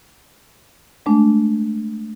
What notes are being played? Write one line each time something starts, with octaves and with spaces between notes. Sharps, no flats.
G#3 A3 D4